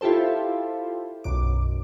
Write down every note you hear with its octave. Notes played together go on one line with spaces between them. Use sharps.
E4 F4 G4 A4 C5
B1 F#2 D6